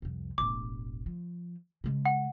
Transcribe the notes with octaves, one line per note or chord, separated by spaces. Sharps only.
C2 F2
E1 A1 D6
F3
C#3 G#3
F#5